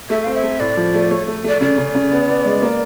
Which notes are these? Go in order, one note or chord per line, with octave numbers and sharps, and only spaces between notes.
A3 E5
C4 F5
E5
A3
A2 D5
F3
A3
A3 C#5
A3
A3 D5
C#3 D5
C#3
C#3
B3
B3
G#3
A#3